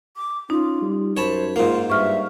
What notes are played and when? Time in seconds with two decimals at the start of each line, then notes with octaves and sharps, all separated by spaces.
0.16 D6
0.50 C#4 D#4 F4
0.82 G3
1.17 F#2 C5 C#5 A5 B5
1.56 G#2 A#3 F4
1.90 G2 E5 C#6 F6